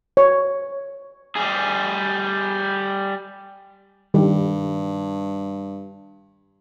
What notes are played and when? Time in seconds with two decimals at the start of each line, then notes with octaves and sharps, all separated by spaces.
0.17 C#5
1.37 G3 G#4
4.14 G2 D#3 G3 G4